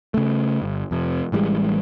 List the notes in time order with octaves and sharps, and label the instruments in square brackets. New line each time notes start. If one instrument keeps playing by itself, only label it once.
[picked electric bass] C#3 A3
G1
F2 C3
A1 E3 G3 G#3